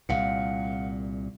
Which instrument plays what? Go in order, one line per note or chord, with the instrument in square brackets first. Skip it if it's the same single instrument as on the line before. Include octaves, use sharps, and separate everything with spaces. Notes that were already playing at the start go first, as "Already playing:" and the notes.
[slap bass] C2 A#2 [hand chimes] F5 F#5 C#7